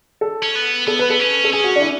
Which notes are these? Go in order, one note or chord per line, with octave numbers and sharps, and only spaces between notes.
A4
C#4
B3
B3 A4
B4
B3 A4
C#4
A4
C#4 G#4
F#4
D4
E4